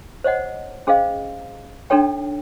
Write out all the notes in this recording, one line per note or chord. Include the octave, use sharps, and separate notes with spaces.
C5 C#5 D#5 F#5
C#4 G#4 C5 D#5 F5
D4 D#4 A4 C#5 G5